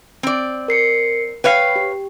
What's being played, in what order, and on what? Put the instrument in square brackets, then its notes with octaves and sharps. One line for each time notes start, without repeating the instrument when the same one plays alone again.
[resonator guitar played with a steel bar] C4 D5
[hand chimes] A#4 C7 C#7
[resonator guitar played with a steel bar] B4 C#5 F5 [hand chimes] G5 C7
[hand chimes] G4